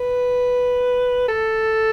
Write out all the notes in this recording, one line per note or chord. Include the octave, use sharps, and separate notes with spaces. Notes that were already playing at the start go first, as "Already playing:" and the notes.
Already playing: B4
A4